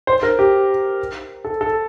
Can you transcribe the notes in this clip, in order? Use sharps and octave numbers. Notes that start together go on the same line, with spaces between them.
C5
A#4
G4
A4
A4